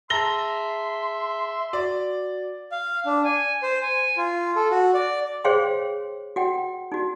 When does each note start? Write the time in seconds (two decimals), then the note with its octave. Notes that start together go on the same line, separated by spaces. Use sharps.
0.10 G#4 E5 A5 A#5 C6 A#6 C7 G7
1.73 F#4 D5
2.72 F5
3.06 D4
3.25 G#5
3.63 C5
3.82 G#5
4.17 F4
4.56 A4
4.71 F#4
4.94 D5
5.45 G#4 C5 C#5 F5 G5 C6
6.36 F#4 F#5 G5
6.92 D#4 F#4